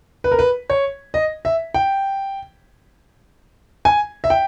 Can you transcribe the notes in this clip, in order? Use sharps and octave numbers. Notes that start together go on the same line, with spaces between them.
B4
A#4
B4
C#5
D#5
E5
G5
G#5
E5
G5